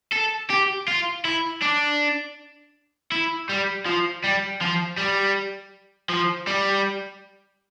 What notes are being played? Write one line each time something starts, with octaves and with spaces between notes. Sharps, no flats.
A4
G4
F4
E4
D4
E4
G3
F3
G3
F3
G3
F3
G3